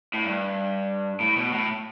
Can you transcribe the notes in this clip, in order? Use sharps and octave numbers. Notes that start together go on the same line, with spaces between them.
A2
G2
A2
B2
A2